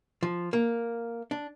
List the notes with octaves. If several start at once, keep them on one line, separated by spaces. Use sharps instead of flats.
F3
A#3
D4